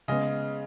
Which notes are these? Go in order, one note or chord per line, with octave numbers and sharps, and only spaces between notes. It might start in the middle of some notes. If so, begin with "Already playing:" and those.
C#3 G#3 B3 D#5